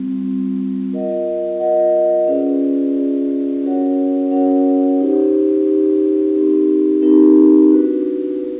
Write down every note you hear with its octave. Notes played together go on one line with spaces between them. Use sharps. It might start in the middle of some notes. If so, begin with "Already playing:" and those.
Already playing: G3 C4 F4
G3 C4 F4
F4 A#4 D#5 F#5
F4 A#4 D#5 F#5
C#4 F4 G#4 B4 D5
C#4 F4 G#4 B4 D5
C#4 F#4 A#4 C#5 F#5
C#4 F#4 A#4 C#5 F#5
D#4 G4 C5
D#4 G4 C5
C4 D#4 G4 A#4
C4 D#4 G4 A#4
D4 F#4 B4
D4 F#4 B4